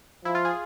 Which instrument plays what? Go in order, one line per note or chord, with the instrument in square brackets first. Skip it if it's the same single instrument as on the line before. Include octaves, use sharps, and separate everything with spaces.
[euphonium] F3 [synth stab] E4
[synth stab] F4
G#4